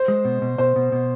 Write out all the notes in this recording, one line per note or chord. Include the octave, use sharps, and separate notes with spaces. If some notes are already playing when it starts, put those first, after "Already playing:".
Already playing: C5
G#3
B2
B2
B2 C5
B2
B2